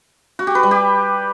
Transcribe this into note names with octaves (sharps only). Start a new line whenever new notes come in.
F#4
G4
B4
G3
G4